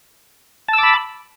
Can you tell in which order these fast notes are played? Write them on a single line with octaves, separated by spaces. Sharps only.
A5 E6 D6 B5